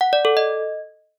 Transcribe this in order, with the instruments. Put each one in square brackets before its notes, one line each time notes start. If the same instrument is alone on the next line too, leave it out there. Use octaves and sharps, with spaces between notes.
[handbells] F#5
D5
A4
D#5